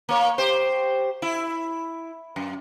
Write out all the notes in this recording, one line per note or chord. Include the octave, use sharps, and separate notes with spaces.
A#3 C#5
G4 C5
E4
F#2